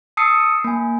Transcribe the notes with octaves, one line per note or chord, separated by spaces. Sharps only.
A5 D#6 E6 C7 C#7
A#3 G#5